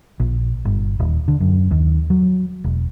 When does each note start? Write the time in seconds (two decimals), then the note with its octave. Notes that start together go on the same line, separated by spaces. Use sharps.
0.20 A#1
0.65 G1
0.99 D#1
1.28 D3
1.40 F#2
1.71 D#2
2.10 F#3
2.64 E1